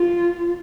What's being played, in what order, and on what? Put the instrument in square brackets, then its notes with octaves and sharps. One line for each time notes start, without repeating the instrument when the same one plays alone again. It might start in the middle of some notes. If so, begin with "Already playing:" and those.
Already playing: [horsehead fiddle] F4